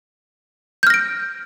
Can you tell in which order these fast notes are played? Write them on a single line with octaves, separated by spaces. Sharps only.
G6 F6 A#6 D7